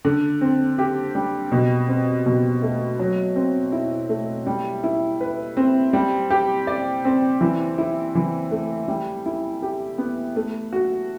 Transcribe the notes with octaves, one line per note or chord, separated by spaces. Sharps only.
D3
C4
G4
G3
B2
C4
B2
A3
F#3
C4
E4
A3
G3
E4
B4
C4
G3
G4
D5
C4
E3
E4
E3
A3
G3
E4
G4
B3
A3
F#4